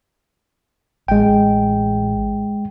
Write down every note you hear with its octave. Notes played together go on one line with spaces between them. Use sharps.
A1 G#3 G5